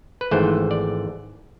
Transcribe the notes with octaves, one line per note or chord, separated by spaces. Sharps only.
B4
G#1 G#2 E3 A3 C5
D5